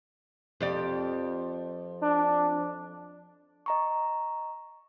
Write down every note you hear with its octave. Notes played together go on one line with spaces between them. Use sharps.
F2 G4 D5
D4
D#5 A#5 C#6